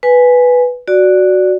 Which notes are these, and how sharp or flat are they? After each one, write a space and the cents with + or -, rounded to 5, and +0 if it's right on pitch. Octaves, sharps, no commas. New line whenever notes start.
B4 +0 G#5 +0
F#4 +0 D5 +0